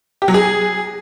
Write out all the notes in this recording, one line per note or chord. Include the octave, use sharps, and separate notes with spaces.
G4
F#3
G#4